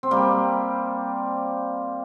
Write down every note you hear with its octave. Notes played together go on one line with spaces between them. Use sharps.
C4
G3 A#3